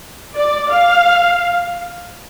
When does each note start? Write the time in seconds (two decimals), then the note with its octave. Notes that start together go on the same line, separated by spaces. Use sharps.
0.35 D5
0.70 F5